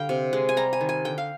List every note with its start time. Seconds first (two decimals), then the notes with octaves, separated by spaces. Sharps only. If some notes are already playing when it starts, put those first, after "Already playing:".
Already playing: D3 G3 F5 G5
0.09 C3
0.33 G#3
0.49 G#5
0.57 G3 A#5
0.73 G#5
0.81 D#3
0.89 G#5
1.05 D3 G5
1.18 F5